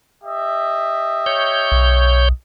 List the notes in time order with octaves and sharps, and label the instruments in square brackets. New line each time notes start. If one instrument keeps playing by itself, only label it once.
[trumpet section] G4 D#5 E5
[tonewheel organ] C#5 G6
[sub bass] B1